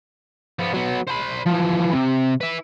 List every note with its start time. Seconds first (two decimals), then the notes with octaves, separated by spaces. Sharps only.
0.59 F3 B3
0.74 F#3 B3
1.07 C5 B5
1.46 E3 F3
1.93 C3
2.41 E4 B4